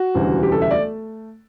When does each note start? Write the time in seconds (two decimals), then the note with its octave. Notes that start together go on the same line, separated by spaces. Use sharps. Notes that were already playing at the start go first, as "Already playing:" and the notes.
Already playing: F#4
0.14 E1 D2 C#3 E3 G3
0.43 G4
0.52 A4
0.62 E5
0.71 A3 D5